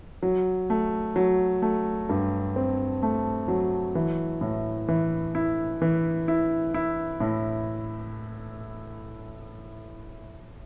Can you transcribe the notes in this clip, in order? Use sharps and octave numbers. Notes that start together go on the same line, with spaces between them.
F#3
A3
F#3
A3
G2
C4
A3
F#3
E3
A2
E3
E4
E3
E4
E4
A2